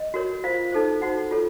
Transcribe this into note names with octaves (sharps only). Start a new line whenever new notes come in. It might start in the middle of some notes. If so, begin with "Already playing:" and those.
Already playing: D#5
F#4 A#4 C#5
F4 C5 F5
D#4 A4 C5
D#4 F#4 C5 F#5
F4 A4 C#5